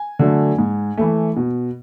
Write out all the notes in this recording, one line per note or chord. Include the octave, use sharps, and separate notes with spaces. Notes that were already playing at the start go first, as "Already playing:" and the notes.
Already playing: G#5
D3 F#3 A3
G#2
E3 A3
B2